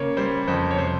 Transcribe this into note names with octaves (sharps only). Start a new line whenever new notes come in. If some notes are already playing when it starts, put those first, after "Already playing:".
Already playing: C#3 A#3 C#5
G3 C5
F2 C5
C#5
C3 C5